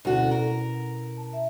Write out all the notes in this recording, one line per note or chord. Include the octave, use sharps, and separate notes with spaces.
D2 B2 C#4 E4 F#4
A#4
A5
E5